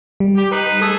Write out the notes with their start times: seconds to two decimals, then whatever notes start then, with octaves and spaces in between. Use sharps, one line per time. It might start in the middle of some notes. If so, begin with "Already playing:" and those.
0.20 G3
0.35 G4
0.52 D#4 B4
0.80 A3 G#4 A4